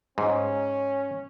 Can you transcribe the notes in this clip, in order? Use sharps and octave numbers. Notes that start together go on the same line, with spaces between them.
G#2 C#4